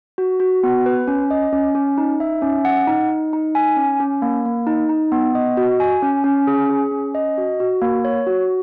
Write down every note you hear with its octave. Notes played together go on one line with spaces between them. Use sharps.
F#4
F#4
B3
B4
C#4
D#5
C#4
C#4
D#4
E5
C#4
F#5
D#4
D#4
D#4
G#5
C#4
C#4
A#3
A#3
D#4
D#4
B3
D#5
F#4
G#5
C#4
C#4
G#4
G#4
C#4
D#5
F#4
F#4
A#3
C#5
F#4